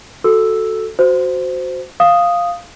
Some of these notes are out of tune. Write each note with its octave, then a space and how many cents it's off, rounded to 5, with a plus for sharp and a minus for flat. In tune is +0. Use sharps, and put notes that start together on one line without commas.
F#4 +0 A4 +0 E6 +0
F#4 +0 C5 -15
F5 +0 D#6 +0